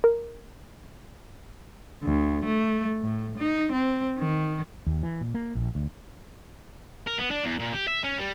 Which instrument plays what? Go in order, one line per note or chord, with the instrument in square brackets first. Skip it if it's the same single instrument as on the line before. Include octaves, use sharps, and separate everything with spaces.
[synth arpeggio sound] A#4
[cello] D2
A3
A2
D#4
C4
D#3
[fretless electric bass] D#2
E3
A#2
A#3
A#1
D2
[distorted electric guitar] A#4
B3
D4
E2
A#2
G4
E5
C#4
G3